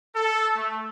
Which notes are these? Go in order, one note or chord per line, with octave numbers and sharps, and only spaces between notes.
A4
A3